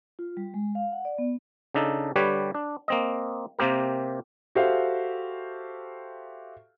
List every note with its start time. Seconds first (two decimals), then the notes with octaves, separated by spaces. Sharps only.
0.19 F4
0.37 G3
0.54 G#3
0.75 F5
0.92 F#5
1.05 D5
1.18 B3
1.74 C#3 D4 D#4 A4
2.16 D3 G3 G4 B4 C#5
2.54 D4
2.88 A#3 C4 D#5
3.59 C3 A#3 C4 G4 A#4
4.55 F#4 G4 A4 C5 E5 F5